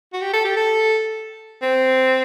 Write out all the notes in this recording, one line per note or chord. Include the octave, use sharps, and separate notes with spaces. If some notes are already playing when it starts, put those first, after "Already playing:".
F#4
G4
A4
G4
A4
C4